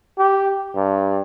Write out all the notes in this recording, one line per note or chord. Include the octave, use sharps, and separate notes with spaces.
G4
G2